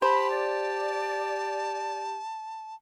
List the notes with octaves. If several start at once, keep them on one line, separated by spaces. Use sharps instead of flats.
G4 C5 A5 B5
D5